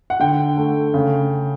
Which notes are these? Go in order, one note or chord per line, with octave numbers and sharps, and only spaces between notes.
F#5
D3 G5
A3
C#3